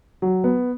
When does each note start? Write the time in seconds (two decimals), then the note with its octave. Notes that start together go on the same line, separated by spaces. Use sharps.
0.22 F#3
0.44 B3